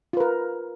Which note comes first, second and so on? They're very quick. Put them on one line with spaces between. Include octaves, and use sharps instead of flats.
F4 B4 A#4